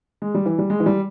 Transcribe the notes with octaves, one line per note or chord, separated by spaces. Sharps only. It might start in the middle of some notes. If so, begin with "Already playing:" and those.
G#3
G3
E3
G3
G#3
E3
G3